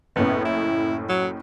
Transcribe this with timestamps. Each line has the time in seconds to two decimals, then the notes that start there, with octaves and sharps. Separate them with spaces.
0.16 F#1 A2 B3 C#4
0.45 E4
1.09 F#3